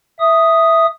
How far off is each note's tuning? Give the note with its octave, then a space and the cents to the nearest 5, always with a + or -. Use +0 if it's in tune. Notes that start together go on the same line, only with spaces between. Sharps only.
E5 +0 D#6 +0